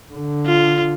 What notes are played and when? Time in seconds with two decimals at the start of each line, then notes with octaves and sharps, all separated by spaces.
0.14 D3
0.46 F4